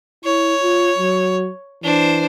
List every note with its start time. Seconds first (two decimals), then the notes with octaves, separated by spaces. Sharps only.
0.25 E4 C#5
0.63 F4
0.98 F#3
1.84 E3 D4 C5